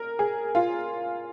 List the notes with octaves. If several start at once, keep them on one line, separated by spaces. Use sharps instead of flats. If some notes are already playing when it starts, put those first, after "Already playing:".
Already playing: A#4
G#4
F4